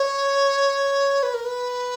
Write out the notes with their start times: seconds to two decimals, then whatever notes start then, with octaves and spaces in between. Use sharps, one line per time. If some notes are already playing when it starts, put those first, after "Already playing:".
Already playing: C#5
1.23 B4
1.34 A#4
1.44 B4